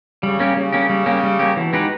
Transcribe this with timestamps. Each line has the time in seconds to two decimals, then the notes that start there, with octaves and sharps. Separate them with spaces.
0.23 C#3 G3
0.39 A#3 C#4 G4
0.56 C#3 G3
0.72 A#3 C#4 G4
0.90 G3
1.06 A#3 C#4 G4
1.23 G3
1.39 A#3 C#4 G4
1.56 B2 E3
1.73 G#3 D#4 G4 B4